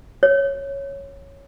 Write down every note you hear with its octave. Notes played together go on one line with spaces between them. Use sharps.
C#5